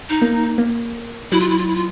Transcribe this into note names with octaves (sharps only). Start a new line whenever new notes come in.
D#4
A#3
A#3
F#3 E4
F4
E4
F4
E4
F4